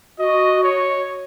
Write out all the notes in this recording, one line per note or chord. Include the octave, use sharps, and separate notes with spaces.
F#4 D#5
C#5